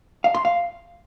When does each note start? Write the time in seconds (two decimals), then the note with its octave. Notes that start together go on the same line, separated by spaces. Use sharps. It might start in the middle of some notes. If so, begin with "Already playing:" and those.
0.24 F5
0.34 C6
0.45 F5